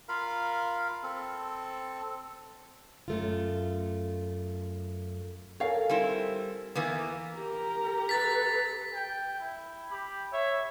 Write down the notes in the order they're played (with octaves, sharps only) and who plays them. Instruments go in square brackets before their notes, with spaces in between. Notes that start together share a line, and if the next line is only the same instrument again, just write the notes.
[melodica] F4 A#4 F5 B5
C4 A4
[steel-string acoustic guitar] F#2 A3 F4
[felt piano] A4 A#4 G#5 [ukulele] C#5 F5
[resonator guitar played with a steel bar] G3 C4 E4
E3 A#3 B3
[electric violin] G4 A#5 [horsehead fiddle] A#4
[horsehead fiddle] A4 B4 [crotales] A6 B6
[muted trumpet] G5
E4
[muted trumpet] G4 [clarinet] B5
[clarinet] C#5 [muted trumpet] E5